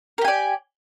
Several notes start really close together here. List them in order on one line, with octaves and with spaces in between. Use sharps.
A#4 G4 G#5 D5